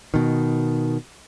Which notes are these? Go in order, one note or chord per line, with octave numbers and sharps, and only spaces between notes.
B2 D#3